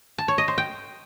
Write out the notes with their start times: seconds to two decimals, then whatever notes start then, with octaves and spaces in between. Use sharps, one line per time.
0.18 A5
0.28 C#5
0.38 D#5
0.48 C5
0.58 G5